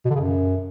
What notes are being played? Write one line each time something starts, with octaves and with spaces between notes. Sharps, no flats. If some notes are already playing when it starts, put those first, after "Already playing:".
B2
D3
C#3
F#2